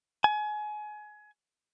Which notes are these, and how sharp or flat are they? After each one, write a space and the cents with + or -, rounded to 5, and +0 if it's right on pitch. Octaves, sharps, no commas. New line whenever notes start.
G#5 +25